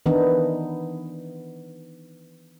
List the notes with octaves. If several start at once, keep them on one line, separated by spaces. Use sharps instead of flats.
D#3 E3 B3 D4 D#4